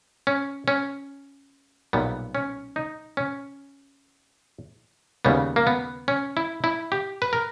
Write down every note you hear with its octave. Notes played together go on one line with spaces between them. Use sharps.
C#4
C#4
B1 A#2 G3 B3
C#4
D#4
C#4
D#2 C#3 G3 B3
A#3
B3
C#4
E4
E4
G4
B4
A#4